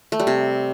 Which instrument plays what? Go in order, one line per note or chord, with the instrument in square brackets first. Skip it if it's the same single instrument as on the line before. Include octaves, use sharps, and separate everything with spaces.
[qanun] A3
G3
C3